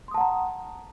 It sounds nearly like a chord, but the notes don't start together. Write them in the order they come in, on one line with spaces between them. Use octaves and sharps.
C6 D#6 A5 F#5 A#5